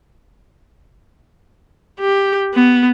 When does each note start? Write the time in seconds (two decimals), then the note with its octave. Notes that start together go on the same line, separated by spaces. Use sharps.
2.00 G4
2.54 B3